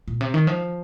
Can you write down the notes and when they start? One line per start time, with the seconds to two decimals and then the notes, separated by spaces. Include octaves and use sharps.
0.08 A#2
0.21 C3
0.34 D#3
0.47 F3